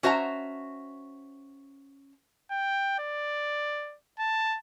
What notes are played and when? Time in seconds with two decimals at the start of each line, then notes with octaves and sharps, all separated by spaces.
0.03 C#4 F#4 C5 E5 G5 A#5
2.51 G5
2.99 D5
4.19 A5